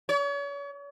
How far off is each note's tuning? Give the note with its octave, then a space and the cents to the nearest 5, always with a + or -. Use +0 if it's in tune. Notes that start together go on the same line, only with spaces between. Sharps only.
C#5 +40